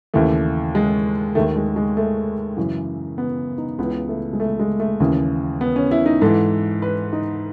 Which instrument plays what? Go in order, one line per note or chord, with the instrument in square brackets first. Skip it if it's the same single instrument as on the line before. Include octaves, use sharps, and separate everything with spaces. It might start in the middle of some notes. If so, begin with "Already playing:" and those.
[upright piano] D#2 C#3 E3 A3
G#3
D#2 D#3 A3
G#3
G#3
A3
F#2 C#3 E3
B3
D#4
C#2 C#3 E3 B3
A3
G#3
A3
G#3
A3
D#2 C#3 E3
B3
C#4
E4
D#4
G#2 E3 A4
B4
D#4